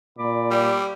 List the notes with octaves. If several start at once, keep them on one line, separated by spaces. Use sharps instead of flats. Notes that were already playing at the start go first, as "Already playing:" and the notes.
A#2 D5 B5 D6
G3